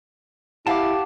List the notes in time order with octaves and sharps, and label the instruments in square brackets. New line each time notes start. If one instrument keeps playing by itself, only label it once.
[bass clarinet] E4 [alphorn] G4 [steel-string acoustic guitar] B4 F5 F#5 [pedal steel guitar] A5 D6